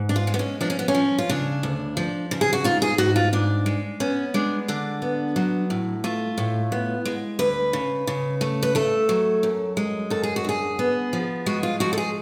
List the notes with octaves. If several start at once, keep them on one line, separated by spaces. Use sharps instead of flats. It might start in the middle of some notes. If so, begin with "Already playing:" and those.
Already playing: G#2
D4
F4
G#3
B3
C#4
F3 D4
C#4
B3
C#4
F3
F4
C#3 D4
D2
F3
C#3
G#4
F#4
G#2 F4
G#4
G#2 F#4
F4
G#2 D4
G#3
B3 C#4
G#3 D4
D3 D4
B3
F#3
A2
A3 F4
A2
B3
G#3
D2 B4
C#3
C#3
A3
B4
A3 A4
F#3
F#2
G#3
F#2 A4
G#4
F#4
D3 G#4
B3
F3
G#3 F#4
F4
F3 F#4
A4
G#4